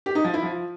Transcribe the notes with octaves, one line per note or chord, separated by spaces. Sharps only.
G4
D#4
F3
E4
F3